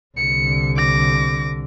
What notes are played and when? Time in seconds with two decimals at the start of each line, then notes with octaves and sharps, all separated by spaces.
0.17 C2 D3 C#7
0.76 D6 A#6